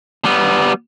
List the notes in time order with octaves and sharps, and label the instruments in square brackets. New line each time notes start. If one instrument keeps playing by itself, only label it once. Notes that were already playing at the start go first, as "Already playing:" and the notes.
[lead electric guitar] G3 B3